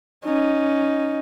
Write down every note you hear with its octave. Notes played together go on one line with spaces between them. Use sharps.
C#4 D#4